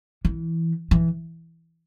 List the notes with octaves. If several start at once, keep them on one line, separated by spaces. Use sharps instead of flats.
E3
E3